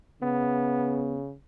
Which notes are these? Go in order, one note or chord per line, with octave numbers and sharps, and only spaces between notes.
C#3 B3